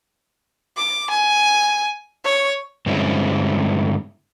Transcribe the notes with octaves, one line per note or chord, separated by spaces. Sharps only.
D6
G#5
C#5
G2 D3 G#3 C4 C#4 E4